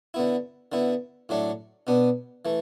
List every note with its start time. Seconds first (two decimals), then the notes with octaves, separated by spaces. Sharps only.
0.14 D3 B3 E4
0.72 D3 B3 E4
1.29 A2 F#3 A3 D4
1.87 B2 B3 D4
2.45 E3 A3